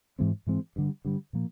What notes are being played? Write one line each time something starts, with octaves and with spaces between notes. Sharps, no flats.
G#2 E3 G#3 C4
G#2 E3 G#3 C4
G2 D3 G3
G2 D3 G3
A#2 F3 A#3